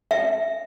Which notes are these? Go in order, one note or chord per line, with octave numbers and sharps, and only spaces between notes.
E5